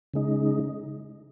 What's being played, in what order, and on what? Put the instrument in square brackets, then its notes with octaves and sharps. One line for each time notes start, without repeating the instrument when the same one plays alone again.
[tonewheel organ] C#3 G#3 D#4